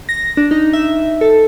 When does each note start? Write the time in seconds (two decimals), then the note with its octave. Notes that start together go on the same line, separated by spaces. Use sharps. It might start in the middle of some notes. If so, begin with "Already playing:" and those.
0.09 A#6
0.37 D4
0.51 D#4
0.73 E5
1.21 A4